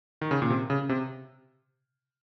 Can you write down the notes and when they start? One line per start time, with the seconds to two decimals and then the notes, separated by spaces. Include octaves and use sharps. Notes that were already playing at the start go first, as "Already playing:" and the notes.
0.21 D#3
0.31 C#3
0.42 A#2
0.50 C3
0.70 C#3
0.89 C3